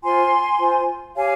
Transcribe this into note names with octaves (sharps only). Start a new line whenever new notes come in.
F4 C5 G#5 C6
F4 C5
G4 C#5 F5 G#5